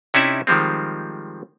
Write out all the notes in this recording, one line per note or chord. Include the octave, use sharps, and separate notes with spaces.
C3 C#4 D#4 E4 D5 E5
D#3 F3 G3 G#3 C4